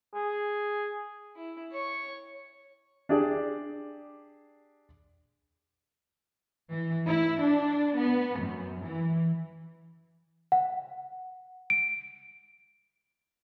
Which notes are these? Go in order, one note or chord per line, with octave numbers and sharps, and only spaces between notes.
G#4
E4
C#5 C#6
D4 G4 G#4 D5
E3
E4
D4
B3
F#2
E3
F#5
D7